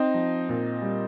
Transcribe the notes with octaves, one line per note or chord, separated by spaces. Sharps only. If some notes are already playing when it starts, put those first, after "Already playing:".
Already playing: C4 D#4
F3
A#2
G3